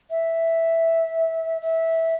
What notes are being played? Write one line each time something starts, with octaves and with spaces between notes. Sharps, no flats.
E5
E5